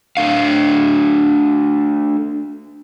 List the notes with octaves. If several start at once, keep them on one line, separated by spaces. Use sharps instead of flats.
A3 D4 F5